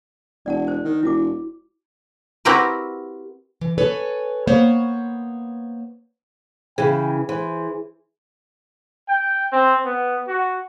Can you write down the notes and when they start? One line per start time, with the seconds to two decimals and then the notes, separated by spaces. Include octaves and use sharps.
0.46 E1 D5 F#5 A5
0.68 C5
0.85 D#3
1.03 E1 E4 F#4 D6
2.45 C4 E4 F#4 G4 A#4 B4
3.61 E3
3.78 A4 B4 C#5 G#5
4.47 A#3 B3 C5 C#5
6.78 C#3 E3 G#4 G5
7.29 E3 C5
9.09 G5
9.53 C4
9.86 B3
10.28 F#4